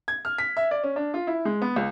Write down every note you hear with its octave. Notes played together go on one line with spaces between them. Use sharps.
G#6
F6
B6
E5
D5
C#4
D4
F4
E4
G#3
B3
C#2